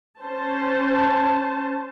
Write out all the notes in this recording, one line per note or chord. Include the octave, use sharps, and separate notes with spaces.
C#4 C5 A5